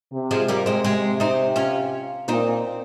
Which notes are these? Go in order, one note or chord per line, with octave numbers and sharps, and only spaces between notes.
C3
F3 G#3
G3 A#3
G#3 C4
C3 G#3 C4
C4 D#4
C#4 F4
A#2 C4 D#4